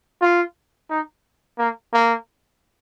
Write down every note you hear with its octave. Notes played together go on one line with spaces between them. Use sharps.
F4
D#4
A#3
A#3